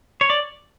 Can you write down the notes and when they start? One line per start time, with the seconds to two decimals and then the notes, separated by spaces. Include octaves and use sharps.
0.21 C#5
0.30 D5